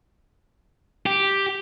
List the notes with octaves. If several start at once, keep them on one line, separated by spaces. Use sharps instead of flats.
G4